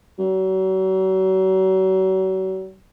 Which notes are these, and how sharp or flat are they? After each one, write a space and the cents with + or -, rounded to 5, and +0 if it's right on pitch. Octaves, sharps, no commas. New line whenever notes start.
F#3 +40